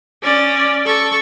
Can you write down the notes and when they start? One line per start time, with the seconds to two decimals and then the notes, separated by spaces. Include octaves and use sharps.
0.23 C#4 D5
0.86 A4 C#6